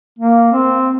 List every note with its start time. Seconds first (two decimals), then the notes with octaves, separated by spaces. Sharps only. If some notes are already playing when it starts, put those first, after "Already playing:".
0.19 A#3
0.52 C4